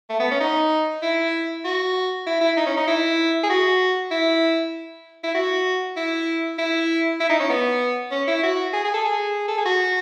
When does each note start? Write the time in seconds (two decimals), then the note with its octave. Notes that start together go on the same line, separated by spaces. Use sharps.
0.10 A3
0.20 B3
0.31 C#4
0.40 D#4
1.02 E4
1.65 F#4
2.26 E4
2.41 E4
2.57 D#4
2.66 C#4
2.77 D#4
2.87 E4
3.44 G#4
3.50 F#4
4.11 E4
5.24 E4
5.35 F#4
5.96 E4
6.58 E4
7.20 E4
7.29 D#4
7.40 C#4
7.50 B3
8.11 C#4
8.28 E4
8.43 F#4
8.73 G#4
8.85 G#4
8.94 A4
9.05 G#4
9.48 A4
9.58 G#4
9.66 F#4